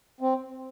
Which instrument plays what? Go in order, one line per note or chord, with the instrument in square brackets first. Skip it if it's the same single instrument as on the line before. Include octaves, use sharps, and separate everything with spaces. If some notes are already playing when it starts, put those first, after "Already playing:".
[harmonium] C4